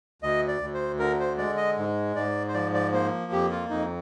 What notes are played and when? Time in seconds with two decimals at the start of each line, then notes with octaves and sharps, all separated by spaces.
0.22 D2 D#5
0.48 D5
0.61 D2
0.74 C5
0.99 D3 A#4
1.19 C5
1.38 G#3 D5
1.57 D#5
1.77 G#2
2.16 G#2 D5
2.48 C5
2.54 F3 D5
2.74 D5
2.92 A#3 C5
3.32 F2 G4
3.51 F4
3.70 F2 D#4